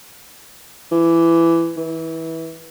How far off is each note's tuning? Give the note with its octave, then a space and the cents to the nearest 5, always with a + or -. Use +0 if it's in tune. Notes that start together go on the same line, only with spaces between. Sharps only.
E3 +20
E3 -20